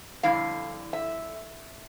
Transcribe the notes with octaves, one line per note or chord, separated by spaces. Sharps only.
F2 D3 G3 E4 F5
E5